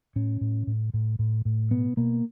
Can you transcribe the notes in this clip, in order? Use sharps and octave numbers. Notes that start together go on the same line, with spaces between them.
A2 C#4
A2
A2
A2
A2
A2
B2 B3
B2 A#3